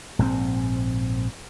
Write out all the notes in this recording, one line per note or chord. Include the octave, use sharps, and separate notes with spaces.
A#1 G#2 F3 C4